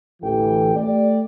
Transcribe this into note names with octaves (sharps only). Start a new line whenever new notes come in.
A1 D2 E3 G4 A4 G5
A3 G4 D5